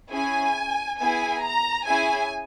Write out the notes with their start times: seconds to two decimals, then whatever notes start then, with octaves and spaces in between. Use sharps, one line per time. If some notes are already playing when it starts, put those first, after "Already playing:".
0.11 C#4 E4 G#4 G#5
0.98 B3 E4 G#4 G#5
1.42 A#5
1.86 C#4 E4 G#4 G#5